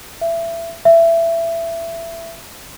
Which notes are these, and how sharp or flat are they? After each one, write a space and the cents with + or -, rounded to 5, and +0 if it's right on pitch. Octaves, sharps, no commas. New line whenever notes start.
E5 +25
E5 +20